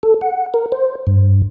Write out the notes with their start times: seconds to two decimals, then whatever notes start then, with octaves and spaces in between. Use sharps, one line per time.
0.03 A4
0.21 F#5
0.54 A#4
0.72 C5
1.07 G2